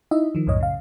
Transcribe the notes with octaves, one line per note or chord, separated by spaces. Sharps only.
D#4 E4 D#5 E5
D#3 F3
C2 F#2 A2 C#5 D#5
C#3 F5